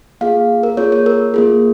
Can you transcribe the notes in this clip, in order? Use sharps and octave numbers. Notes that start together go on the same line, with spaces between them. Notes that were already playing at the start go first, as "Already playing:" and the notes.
A#3 F4 G#4 F5
A#4
A#3 F4 G#4 C#5
C#5
A#4
A#3 F4 G#4